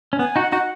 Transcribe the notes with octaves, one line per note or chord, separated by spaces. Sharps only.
C#4
B3 G#5
D#4 F#4 F#5
D#4 F#4 F#5